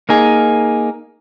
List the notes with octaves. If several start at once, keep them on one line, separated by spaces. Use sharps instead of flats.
A#3 D#4 G#4